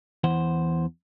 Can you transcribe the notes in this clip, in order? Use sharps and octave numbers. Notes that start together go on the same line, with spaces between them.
E2 E3 C5 F#5